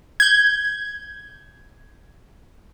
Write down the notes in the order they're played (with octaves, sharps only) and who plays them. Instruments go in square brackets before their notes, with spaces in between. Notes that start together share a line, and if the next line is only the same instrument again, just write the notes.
[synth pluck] G6 G#6